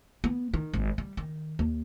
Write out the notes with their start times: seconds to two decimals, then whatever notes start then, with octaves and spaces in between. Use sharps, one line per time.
0.24 B3
0.54 D#3
0.74 G#1
0.98 G3
1.17 D#3
1.59 D#2